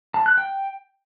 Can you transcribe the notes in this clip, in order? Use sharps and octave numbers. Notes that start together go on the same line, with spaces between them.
A5
F#6
G5